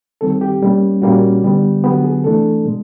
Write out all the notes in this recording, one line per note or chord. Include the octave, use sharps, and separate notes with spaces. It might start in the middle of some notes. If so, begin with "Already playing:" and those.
D#3 G3 C4 A4
G4
B2 G3 A#3 C#4
A#2 G3 A#3 C#4 F#4
D3 G3 B3
D3 F#3 B3 G4
G#4
C3 E3 A3 D4 A4
B2 G#3